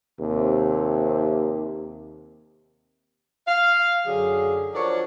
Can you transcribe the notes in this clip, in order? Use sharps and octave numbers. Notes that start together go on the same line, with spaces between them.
D#2 C3
F5
F#2 D3 F#3 G#4
F3 D4 F#4 A#4 C#5 D5